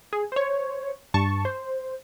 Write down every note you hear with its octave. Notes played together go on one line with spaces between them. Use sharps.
G#4
C5 C#5
G2 A5 C#6
C5